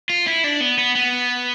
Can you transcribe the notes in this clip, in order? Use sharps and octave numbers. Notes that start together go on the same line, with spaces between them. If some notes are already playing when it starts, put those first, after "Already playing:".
F4
E4
D4
B3
B3
B3